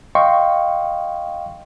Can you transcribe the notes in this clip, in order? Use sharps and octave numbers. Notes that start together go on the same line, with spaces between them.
D#5 F5 G5 C6 C#6